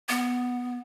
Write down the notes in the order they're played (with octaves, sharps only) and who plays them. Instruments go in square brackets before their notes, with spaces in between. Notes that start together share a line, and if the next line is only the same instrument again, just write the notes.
[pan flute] B3